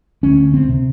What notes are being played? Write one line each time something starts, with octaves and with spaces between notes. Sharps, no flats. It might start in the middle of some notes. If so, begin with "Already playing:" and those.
D2 C#4
C4
C3